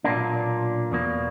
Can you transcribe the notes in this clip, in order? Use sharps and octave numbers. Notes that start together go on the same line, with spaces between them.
B1 A#2 A#3 D4
E2 B2 A#3